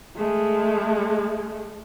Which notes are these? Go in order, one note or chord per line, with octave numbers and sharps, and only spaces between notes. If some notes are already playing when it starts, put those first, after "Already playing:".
G#3 A3